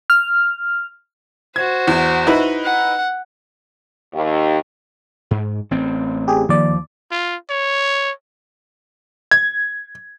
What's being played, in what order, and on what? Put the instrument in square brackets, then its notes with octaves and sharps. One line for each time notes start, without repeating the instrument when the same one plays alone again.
[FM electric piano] F6
[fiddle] F#4 C5 [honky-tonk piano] G#6
[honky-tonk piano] E2
D#4 E4 B4
[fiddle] F#5
[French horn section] D#2
[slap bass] G#2
A1 C4
[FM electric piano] G4 G#4
[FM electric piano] D#2 D5 [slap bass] F3
[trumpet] F4
C#5
[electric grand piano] G#6